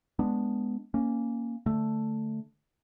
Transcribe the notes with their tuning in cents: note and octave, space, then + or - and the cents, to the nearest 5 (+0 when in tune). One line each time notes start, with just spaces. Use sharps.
G#3 +10 B3 +0 D4 +0
A#3 +0 C#4 +0
D3 +0 A3 +0